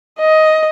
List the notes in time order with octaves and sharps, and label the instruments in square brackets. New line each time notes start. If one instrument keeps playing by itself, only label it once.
[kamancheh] D#5